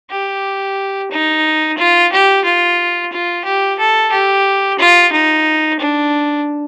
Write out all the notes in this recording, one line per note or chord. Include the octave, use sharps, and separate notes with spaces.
G4
D#4
F4
G4
F4
F4
G4
A4
G4
F4
D#4
D4